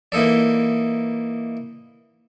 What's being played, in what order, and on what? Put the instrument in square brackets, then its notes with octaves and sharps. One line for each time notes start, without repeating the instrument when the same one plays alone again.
[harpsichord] E3 A#3 D#4 A4 D5